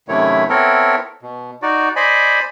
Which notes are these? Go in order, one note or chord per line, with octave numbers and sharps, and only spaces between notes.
F#2 C3 D#3 A3 E4 C#5
B3 C4 E4 A4 A#4 C#5
B2
D#4 F#4 D5
C5 D5 D#5 G#5 B5